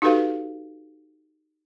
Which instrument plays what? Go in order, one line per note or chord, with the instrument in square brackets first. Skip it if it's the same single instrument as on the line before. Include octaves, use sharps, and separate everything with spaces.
[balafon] D#4 F#4 G4 A4 B4 F5